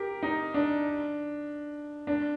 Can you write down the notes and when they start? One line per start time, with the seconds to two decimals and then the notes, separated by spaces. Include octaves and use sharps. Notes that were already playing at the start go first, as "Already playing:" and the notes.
Already playing: G4 A#4
0.23 D#4
0.54 D4
2.07 D4